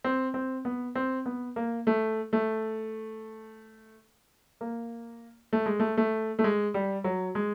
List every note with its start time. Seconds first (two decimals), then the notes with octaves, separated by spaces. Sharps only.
0.04 C4
0.34 C4
0.65 B3
0.95 C4
1.26 B3
1.56 A#3
1.87 A3
2.33 A3
4.61 A#3
5.53 A3
5.66 G#3
5.80 A3
5.97 A3
6.39 A3
6.44 G#3
6.74 G3
7.04 F#3
7.35 G#3